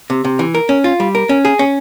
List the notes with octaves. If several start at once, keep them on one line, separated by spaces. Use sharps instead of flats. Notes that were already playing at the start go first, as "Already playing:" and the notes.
C3
C3
E3
A#4
C#4
F4
G3
A#4
C#4
G#4
C#4